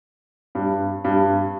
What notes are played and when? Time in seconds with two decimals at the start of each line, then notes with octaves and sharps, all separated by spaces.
0.55 G2
1.04 G2